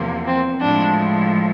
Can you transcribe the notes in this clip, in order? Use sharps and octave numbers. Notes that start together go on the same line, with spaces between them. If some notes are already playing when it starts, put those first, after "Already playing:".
Already playing: E2 C3 F3 A#3
C4
A2 F3 G#3 D4